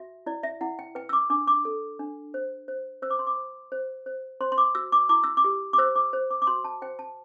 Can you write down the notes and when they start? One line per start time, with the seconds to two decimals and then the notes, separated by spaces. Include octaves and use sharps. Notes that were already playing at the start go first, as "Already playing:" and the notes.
Already playing: F#4 E5
0.26 E4 D5
0.43 E5
0.61 E4 F#5
0.79 G5
0.95 B4 G5
1.09 E6
1.13 D6
1.30 D4 D6
1.47 D6
1.65 A4
1.99 D4
2.34 C5
2.68 C5
3.02 C5 E6
3.10 D6
3.19 C6
3.27 D6
3.37 C5
3.72 C5
4.06 C5
4.41 C5 C6
4.52 C6
4.58 D6
4.75 F#4 E6
4.92 D6
5.09 E4 D6
5.24 E6
5.37 D6
5.44 G4
5.73 D6
5.78 C5 E6
5.95 D6
6.13 C5
6.31 D6
6.42 D6
6.47 F#4 C6
6.64 A5
6.82 C5 G5
6.99 A5